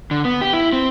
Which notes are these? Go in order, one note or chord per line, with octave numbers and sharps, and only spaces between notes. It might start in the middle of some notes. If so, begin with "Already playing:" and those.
D3
B3
G4
E4
C4